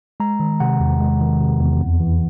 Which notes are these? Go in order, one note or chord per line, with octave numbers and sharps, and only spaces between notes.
G#3 A#5
D#3
C3 F#5
E2
G#3
D#3
C3
E2
F2
E3